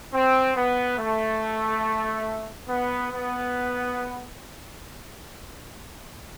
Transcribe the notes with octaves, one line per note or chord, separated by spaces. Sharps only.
C4
B3
A3
B3
B3